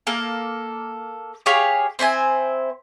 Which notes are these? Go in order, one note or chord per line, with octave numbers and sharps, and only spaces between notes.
A#3 A4
G4 G#4 C#5 F5
C4 E4 C5 G#5